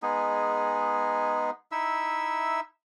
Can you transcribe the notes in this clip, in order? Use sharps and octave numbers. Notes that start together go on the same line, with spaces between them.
G#3 B3 D#4 G#4
D#4 E4 E5 E6